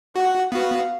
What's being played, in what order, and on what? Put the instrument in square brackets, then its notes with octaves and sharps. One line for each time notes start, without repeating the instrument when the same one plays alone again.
[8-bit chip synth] F#4 [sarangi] F#5
[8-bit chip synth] B3 F#4 [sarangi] F5